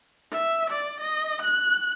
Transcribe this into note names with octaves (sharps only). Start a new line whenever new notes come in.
E5
D5
D#5
F#6